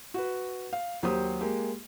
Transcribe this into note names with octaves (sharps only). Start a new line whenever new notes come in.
F#4 B4
F5
D#2 F#3 G4 C5 D#6
G#3 A#3 G4